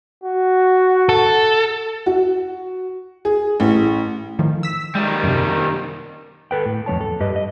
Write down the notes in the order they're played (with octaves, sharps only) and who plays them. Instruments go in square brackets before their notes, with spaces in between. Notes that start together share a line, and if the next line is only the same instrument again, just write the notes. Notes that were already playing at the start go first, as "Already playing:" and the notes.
[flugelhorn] F#4
[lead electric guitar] A4
[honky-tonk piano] F#4
G#4
A1
[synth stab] A2 D#3 F3
E6 B6
[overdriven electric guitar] D#3 G3 [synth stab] G#3
[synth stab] F#2 C3
[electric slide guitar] A4 B4 G5
A2
F2 G#3 C#5 A5
A4
G2 G4 B4 D#5
D#5